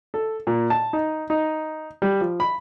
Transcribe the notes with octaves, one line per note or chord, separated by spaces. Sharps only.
A4
A#2
A5
D#4
D#4
G3
F3
B5